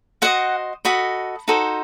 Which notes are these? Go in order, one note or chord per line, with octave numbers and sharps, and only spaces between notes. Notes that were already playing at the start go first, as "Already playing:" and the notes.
F#4 C5 D#5 F#5
F#4 A4 D#5 B5
D#4 F#4 A4 C5